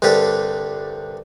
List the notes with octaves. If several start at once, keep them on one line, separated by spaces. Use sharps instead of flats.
C2 G2 D3 D4 G4